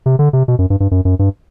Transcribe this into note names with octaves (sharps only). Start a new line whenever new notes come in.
C3
D3
C3
B2
F#2
G2
G2
F#2
F#2
G2